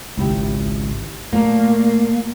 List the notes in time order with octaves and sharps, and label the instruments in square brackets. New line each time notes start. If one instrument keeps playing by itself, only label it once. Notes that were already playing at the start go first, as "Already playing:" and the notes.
[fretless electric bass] G#1 C#2 [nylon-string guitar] D#4 E4 G4
[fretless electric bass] A#2 [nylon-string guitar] A3 A#4 [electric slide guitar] A#3